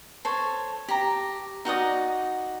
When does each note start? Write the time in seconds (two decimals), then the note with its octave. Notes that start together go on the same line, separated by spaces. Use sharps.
0.25 A4 C5 C#5
0.88 G4 A#5
1.65 D#4 F#4 D5 D#6